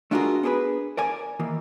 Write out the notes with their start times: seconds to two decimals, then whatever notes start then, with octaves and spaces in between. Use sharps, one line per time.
0.11 A3 D4 F4 F#4 G#4 A#4
0.43 B3 D4 G#4 A4 B4
0.97 A#4 D5 G#5
1.40 D#3 E3 A#3